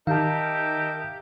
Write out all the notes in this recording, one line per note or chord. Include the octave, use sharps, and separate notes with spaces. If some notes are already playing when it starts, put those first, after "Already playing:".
D#3 D#4 G4 A#4 E5 F5 A5 G6